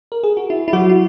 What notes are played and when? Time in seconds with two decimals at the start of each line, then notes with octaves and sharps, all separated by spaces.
0.12 A#4
0.24 G#4
0.37 F#4
0.50 E4
0.68 E4
0.73 F#3 F#4
0.90 E4